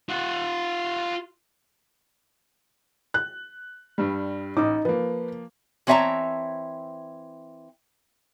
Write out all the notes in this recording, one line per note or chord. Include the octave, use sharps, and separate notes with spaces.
F4 F#5
F#6
G2 G3
A1 D#4 D6
F3 A#3 B4
E3 C4 C#5 E5 A5 A#5